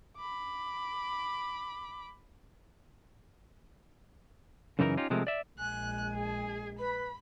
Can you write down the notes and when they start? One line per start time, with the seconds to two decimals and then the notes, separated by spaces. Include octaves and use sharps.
0.17 B5 D6
4.79 F#2 C#3 E3 D#4 F#4 A#4
4.97 C#4 D#4 F4 G4
5.10 C3 F3 G#3 A3 A#4
5.27 D5 E5
5.59 A#1 G#3 G#5 F#6
6.15 G#4
6.79 B4 B5